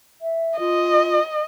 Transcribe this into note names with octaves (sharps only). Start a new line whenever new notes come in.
E5
F4 D#5